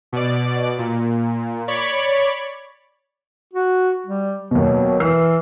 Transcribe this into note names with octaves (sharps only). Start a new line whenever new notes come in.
B2 D5
A#2
C#5 D5 B5
F#4
G3
D#2 B2 F#3
E3 E6 F6 C7